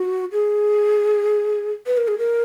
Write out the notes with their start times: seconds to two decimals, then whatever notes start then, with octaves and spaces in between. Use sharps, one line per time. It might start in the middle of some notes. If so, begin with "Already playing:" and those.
Already playing: F#4
0.32 G#4
1.87 B4
1.97 A#4
2.08 G#4
2.18 A#4